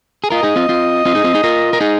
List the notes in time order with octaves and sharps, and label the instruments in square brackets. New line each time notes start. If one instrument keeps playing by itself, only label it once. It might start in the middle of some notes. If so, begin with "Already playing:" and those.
[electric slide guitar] G#4
[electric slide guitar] F4 A#4 [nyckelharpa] D#5
[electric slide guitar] D#4 G#4
C4 F4
C4 F4
C4 F4
D#4 G#4
C4 F4
D#4 G#4
F4 A#4
A#4
D#4 G#4